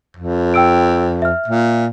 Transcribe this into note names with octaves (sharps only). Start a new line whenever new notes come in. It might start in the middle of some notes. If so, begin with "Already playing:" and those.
F2
G5 E6 D7
E5 F6
A#2